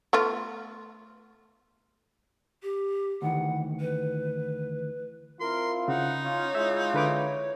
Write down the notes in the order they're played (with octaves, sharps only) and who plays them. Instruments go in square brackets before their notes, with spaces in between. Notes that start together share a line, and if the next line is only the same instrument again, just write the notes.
[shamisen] A3 B3 F4
[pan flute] G4
[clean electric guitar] D2 D#3 E3 [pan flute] F#5
[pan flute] B4
[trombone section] C4 E4 F4 [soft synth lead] A#4 [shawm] C6
[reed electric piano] C#3 [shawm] D#4 [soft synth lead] F#5
[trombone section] C#4 F4 [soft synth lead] C#5
[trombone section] G#3 E4 F4 [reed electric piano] E5
[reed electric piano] D3 B4 D6